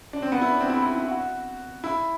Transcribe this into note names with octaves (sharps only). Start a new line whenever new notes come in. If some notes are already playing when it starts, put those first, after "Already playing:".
D4
C4
B3
E4
D4
C4
E4
E4
E4
F#4
E4